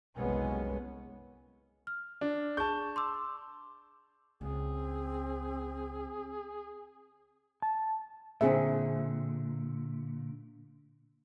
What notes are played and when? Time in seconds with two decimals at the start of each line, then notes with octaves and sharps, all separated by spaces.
0.17 F#1 C2 G#3 B3 C#4
1.87 F6
2.21 D4
2.57 G#4 A5 C#6 G6
2.96 C6 D6 E6
4.41 C#2 C4 G#4
7.62 A5
8.41 A#2 D3 C4 G#4 E5